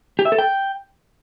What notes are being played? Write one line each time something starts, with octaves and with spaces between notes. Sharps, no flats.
G4
E5
A4
G5